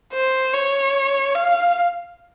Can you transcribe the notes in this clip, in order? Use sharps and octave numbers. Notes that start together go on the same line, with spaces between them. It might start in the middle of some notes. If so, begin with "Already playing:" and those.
C5
C#5
F5